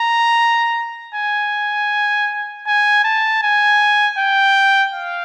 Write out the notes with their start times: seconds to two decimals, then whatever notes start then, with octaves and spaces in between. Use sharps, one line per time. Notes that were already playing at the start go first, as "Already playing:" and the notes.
Already playing: A#5
1.15 G#5
2.67 G#5
3.04 A5
3.43 G#5
4.18 G5
4.94 F5